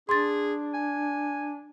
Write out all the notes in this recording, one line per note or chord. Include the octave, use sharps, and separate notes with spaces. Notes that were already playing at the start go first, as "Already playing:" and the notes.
D4 G#4 C6 A6
G#5